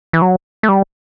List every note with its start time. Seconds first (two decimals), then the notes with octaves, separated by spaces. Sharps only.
0.13 E3
0.22 F#3
0.63 A3
0.69 G3